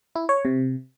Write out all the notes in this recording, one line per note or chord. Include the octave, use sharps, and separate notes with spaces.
E4
C#5
C3